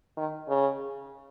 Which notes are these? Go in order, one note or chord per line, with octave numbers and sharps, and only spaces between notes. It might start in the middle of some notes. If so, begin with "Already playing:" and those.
D#3
C#3